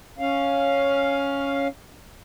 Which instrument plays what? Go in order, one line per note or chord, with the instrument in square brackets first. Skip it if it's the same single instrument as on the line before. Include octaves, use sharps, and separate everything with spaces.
[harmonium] C#4 F5